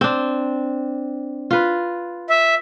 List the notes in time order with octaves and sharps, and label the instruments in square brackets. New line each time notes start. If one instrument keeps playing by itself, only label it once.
[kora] C4 D4
F4 B4
[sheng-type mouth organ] E5